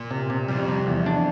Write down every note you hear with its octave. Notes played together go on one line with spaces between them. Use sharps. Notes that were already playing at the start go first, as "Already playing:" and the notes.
Already playing: A#2
C3
C3
F2 G3
C3
E2
D4